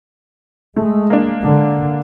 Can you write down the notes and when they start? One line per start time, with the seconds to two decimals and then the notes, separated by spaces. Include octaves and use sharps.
0.76 G#3 A3
1.10 A#3 D4
1.45 D3